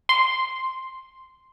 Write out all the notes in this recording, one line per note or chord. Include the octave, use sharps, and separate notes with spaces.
C6